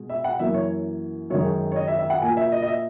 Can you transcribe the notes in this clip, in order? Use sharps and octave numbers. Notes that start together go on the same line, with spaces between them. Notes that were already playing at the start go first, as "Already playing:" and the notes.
Already playing: B2 G#3
E5
F#5
F#2 E3 A#3 E5
C#5
F#2 D#3 G#3 C#5
C#5
D#5
E5
E5
F#5
A#2 A#3 G#5
E5
D#5
D#5
E5